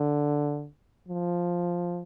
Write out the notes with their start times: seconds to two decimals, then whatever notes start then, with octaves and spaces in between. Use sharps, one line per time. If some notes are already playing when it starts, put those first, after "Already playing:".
Already playing: D3
1.08 F3